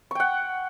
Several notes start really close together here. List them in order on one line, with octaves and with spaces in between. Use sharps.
C#6 G5 F#5